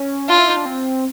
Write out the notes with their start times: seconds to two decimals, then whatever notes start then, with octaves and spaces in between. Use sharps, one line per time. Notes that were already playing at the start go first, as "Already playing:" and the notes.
Already playing: C#4
0.28 D4 F4
0.38 E4
0.48 D#4
0.57 D4
0.66 C4